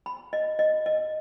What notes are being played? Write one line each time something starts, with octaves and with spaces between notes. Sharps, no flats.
B5
D#5
D#5
D#5